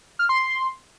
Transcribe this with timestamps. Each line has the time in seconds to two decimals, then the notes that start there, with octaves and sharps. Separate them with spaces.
0.19 F6
0.29 C6
0.39 C6